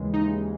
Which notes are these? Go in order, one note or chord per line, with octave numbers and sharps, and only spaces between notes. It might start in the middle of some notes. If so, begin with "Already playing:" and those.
Already playing: D#2 C#3 E3 G#3
D#4